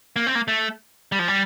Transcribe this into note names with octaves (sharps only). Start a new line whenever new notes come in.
A#3
C4
A#3
A3
G3
F3
G3